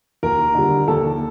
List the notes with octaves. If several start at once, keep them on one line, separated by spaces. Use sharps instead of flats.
D#2 A#4
D3 G3
D#2 A4